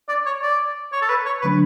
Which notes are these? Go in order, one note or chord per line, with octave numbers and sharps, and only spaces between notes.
D5
C#5
D5
C#5
A4
B4
C#5
D3 F#3 A3 D4 B4